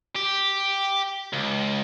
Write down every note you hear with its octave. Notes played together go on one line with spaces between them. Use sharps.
G4
C#2